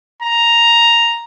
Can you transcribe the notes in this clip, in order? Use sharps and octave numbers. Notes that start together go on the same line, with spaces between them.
A#5